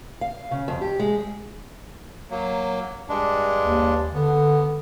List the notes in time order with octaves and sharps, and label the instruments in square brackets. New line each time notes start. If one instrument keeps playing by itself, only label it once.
[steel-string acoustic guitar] F5
C#3
F2
G4
G#3
[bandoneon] F#3 A#3
G2 G#3 D4
[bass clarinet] D#2
[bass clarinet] D3 [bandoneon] B3